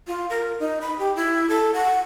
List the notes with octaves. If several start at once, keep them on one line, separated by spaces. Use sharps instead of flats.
F4
A#4
D#4
B5
G4
E4
A4
F#5